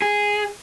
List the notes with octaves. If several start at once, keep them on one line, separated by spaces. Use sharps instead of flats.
G#4